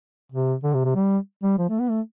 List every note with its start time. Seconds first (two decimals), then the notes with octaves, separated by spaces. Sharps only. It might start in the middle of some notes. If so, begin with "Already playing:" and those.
0.32 C3
0.64 D3
0.74 C3
0.85 C3
0.95 G3
1.43 G3
1.58 F3
1.69 A3
1.80 B3
1.90 A3